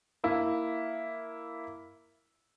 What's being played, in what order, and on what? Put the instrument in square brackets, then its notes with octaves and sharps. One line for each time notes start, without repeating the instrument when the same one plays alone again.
[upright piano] A#3 E4